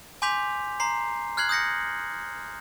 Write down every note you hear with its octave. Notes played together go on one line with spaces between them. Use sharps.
G#5 C6 D6 G6 B6 F7
A#5 C6 C7
F6 F#6 G#6 C7 F#7
D#6 G6 A#6 C#7